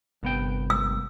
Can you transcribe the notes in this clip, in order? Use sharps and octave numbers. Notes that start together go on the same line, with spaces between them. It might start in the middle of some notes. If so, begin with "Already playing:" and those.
G1 C2 B3 G5
E6